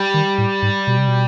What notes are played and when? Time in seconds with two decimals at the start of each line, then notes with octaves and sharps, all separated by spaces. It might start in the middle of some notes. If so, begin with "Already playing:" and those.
Already playing: G3
0.14 D#3
0.38 A2
0.62 G#2
0.87 B2
0.98 C3
1.08 B2